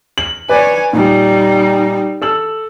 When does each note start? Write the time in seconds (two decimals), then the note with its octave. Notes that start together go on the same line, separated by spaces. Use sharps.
0.18 F#7
0.49 B4 C#5 D5 G#5
0.93 A#2 G3 D#4
2.22 A4 E6 F#7